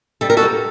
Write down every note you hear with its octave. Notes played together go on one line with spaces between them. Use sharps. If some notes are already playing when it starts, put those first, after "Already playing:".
G3 A4
A#4
F#4 A4
G3